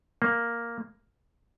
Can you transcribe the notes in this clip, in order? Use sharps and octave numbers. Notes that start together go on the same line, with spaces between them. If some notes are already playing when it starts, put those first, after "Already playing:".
A#3